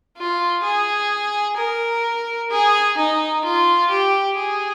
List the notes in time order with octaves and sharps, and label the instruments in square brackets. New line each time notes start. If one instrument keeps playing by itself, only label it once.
[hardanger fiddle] F4
G#4
A#4
G#4
D#4
F4
G4
G#4